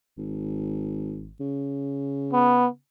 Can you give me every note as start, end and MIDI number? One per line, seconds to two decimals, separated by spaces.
0.17 1.34 32
1.40 2.77 49
2.33 2.68 59